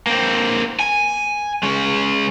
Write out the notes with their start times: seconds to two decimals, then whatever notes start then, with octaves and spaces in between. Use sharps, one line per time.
0.07 A#3 C4
0.79 G#5
1.63 G#3 C#4